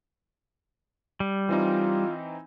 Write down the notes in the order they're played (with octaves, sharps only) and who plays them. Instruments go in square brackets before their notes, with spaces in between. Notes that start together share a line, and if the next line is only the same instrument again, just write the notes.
[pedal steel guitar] G3
[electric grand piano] E3 C4 D#4 [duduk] F4